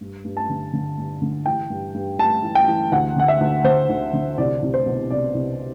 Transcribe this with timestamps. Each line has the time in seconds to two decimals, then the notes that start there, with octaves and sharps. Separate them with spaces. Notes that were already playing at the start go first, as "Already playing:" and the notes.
0.01 G2
0.25 G2
0.37 A5
0.49 D3
0.73 D3
0.98 G2
1.22 D3
1.46 E3 G5
1.70 G2
1.94 G2
2.18 G2 A5
2.43 E3
2.55 G5
2.68 E3
2.92 D2 F#5
3.16 D3 F#5
3.28 E5
3.41 D2
3.64 D3 C5
3.90 D2
4.14 D3
4.38 C2 D5
4.62 C2
4.74 C5
4.86 B2
5.10 C2 D5
5.35 C2